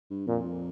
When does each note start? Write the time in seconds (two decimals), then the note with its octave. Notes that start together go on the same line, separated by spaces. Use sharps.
0.10 G2
0.27 F2 A#2